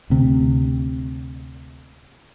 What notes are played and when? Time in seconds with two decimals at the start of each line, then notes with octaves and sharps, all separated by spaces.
0.10 D2 C3